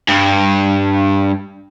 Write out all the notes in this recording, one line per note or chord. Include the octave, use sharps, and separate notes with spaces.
G2